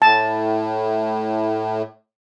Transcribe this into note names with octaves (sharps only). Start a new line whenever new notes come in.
A2 A5